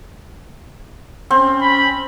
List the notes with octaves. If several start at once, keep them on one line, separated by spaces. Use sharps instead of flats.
C4 C#4
B5